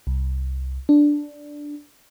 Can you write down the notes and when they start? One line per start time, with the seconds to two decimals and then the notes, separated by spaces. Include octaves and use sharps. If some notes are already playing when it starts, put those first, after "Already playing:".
0.07 C2
0.89 D4